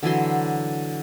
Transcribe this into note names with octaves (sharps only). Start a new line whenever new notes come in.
D3 E3 F#3 C6